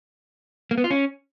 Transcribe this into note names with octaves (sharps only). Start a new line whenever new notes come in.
A#3
B3
F4
C#4